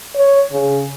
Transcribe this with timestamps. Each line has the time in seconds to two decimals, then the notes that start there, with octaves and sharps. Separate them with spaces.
0.16 C#5
0.52 C#3